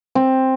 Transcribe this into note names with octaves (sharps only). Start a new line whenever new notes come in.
C4